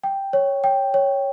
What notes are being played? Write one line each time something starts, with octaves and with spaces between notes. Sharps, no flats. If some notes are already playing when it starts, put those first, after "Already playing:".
G5
C#5
G5
C#5